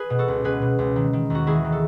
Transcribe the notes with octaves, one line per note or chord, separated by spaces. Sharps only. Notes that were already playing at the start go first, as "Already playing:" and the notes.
Already playing: G#4 B4
B2
F#4 A4
C#2
B2 G#4 B4
B2
C#2
D#3
D#3
D#2 F#4
D#3 E4 G#4
D#3
A4